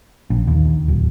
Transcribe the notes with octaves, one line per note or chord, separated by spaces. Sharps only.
A#1
D#2
D1